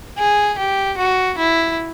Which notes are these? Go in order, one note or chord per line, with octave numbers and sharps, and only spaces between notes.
G#4
G4
F#4
E4